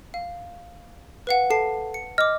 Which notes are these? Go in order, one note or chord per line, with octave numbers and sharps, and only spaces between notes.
F5
B4 F5 F#5
A4 A5 C7
C#7
D#5 D6 F6